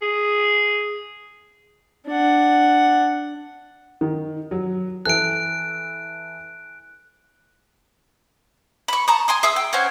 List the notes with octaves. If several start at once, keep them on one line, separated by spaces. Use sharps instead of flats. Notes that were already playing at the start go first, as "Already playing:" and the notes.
G#4
D4 F#5
D#3
F#3
E3 A4 F#6 D7
B5 C#6
A5 A#5 C#6 D#6
G#5 C6 D#6
G#4 E5 D#6 E6
G5
C#4 C5 F#5 G#5